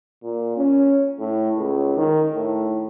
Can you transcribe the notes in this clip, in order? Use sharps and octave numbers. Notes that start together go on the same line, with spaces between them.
A#2
C#4
A2
C#2
D#3
A2